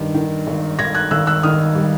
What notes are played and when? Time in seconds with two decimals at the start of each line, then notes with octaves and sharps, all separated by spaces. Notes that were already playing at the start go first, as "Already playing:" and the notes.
Already playing: G2 D#3
0.14 D#3
0.47 G#1
0.79 G#1 G#6 A#6
0.95 F#6 G#6
1.11 G#1 E6 F#6
1.27 E6 F#6
1.43 D#3 D#6 F6
1.75 G3